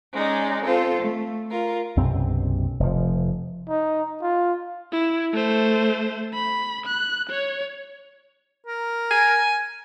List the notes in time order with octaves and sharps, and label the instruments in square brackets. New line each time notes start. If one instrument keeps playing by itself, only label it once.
[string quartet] G#3 C#4 D#4 D5
C4 F4 A4 C5
A3
F4 A#4
[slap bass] B1 F#2 C3 C4
F1 F3
[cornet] D#4
F4
[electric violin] E4
A3 C5
B5
F#6
C#5
[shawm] A#4
[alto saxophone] G#5